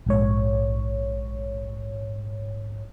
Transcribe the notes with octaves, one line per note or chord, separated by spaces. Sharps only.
A#1 G#2 C#5